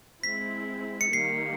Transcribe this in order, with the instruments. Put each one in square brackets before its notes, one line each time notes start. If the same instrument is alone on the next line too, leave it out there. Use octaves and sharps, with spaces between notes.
[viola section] G#3 C4 E4 [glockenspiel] B6
[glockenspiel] C#7
[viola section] D#3 G3 A#3 [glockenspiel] C7